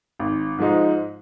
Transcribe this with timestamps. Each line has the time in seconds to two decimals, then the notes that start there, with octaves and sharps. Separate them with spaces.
0.19 G#1
0.58 G#2 F3 G#3 D#4